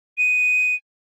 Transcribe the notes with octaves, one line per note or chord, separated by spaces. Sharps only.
D#7